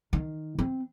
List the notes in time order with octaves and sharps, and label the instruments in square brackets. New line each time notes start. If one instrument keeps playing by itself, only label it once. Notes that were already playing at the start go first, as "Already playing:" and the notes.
[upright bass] D#3
C4